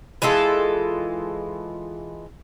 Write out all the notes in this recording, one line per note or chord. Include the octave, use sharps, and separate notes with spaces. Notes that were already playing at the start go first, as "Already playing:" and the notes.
E3 G#3 F4 A4